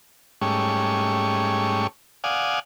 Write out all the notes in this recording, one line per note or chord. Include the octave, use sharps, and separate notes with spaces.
G#2 G3 A3 C#4 C#6
D5 F5 F#5 G#5 D#6